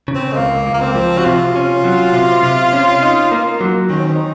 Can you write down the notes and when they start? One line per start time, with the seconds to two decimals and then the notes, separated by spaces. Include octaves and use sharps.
0.08 C#3
0.15 C4
0.32 G#3
0.37 C#2 A#3
0.67 C#2
0.74 A#3
0.81 C4
0.96 F3
1.18 F#4
1.25 C3 F4
1.56 C#4
1.84 F#3
2.14 C3
2.43 C3
2.73 C#4
3.02 D#4
3.31 A#3
3.61 F#3
3.90 D#3 C#4
3.97 C4
4.05 C#4
4.12 D#4